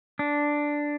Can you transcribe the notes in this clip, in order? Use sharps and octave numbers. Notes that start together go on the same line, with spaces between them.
D4